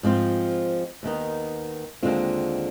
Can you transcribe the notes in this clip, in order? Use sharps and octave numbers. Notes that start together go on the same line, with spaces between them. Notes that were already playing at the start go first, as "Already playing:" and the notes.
G#2 F3 C4 F4
D#2 D#3 B3 D#4
D#2 D3 G#3 C4 F4